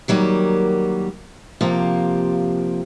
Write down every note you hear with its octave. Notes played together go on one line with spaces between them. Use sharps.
D#3 F#3 G3 A#3
C3 F3 A#3 G4